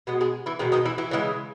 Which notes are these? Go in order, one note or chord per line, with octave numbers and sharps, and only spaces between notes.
B2 G#3 B3
G#3 G#4
E3 E4
B2 D#3 G#3 D#4
D#3 D#4
E3 E4
E3 E4
C#3 E3 G#3